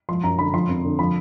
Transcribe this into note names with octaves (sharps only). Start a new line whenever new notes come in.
F3 C6
F#2 A#5
D3 B5
F3 C6
F2
D3
F3 B5